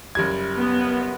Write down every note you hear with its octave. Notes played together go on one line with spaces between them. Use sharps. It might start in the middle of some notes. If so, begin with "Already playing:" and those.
F#1 G3 G#6
B3